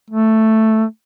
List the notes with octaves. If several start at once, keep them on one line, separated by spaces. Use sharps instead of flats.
A3